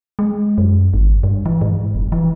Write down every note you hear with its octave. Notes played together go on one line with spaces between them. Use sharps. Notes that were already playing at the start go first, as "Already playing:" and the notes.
G#3
F#2
G#1
G2
E3
G#2
F1
E3